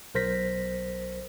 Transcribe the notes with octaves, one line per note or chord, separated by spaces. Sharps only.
B1 A#4 C5 A#6 B6